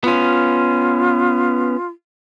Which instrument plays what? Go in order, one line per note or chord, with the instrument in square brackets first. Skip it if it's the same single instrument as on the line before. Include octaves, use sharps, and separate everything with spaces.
[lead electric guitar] B3 C#4 [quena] F4